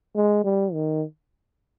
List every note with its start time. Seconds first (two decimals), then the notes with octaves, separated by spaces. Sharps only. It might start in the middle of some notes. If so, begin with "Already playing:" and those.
0.16 G#3
0.44 G3
0.73 D#3